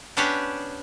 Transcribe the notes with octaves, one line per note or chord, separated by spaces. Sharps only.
B3 C#4 D4 G4 C#5 D5